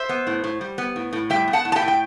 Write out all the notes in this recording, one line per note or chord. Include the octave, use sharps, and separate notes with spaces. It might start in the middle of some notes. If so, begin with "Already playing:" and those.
Already playing: C5 E5
B3
A2
A2
G3
B3
A2
A2
G3 E5 G5
B3
F#5 A5
A2
A5
E5 G5
A2
G5